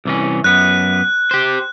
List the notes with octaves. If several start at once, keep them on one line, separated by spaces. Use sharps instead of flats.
C2 E3 C#4
F#2 B3 F#6
G4 C5